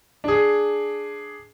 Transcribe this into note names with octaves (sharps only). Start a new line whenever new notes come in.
D4 G#4